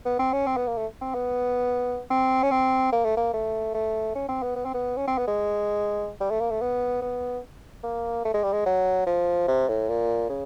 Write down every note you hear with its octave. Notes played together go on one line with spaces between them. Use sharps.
B3
C4
C#4
C4
B3
A#3
A3
C4
B3
C4
C#4
C4
A#3
A3
A#3
A3
A3
C#4
C4
B3
B3
C4
B3
C#4
C4
B3
G#3
G3
A3
A#3
A3
B3
B3
A#3
A3
G#3
G3
G#3
F#3
F3
C3
A2
A#2
C#3